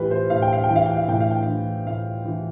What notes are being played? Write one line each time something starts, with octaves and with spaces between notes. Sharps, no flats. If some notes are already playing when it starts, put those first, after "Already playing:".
Already playing: A2 E3 F4 G4 B4
C5
A2 F5
G5
F5
G5
E3
F5
G5
F5
A2 G5
F5
G5
F5
E3
A2 F5
E3